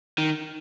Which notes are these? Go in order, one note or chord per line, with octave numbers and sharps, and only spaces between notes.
D#3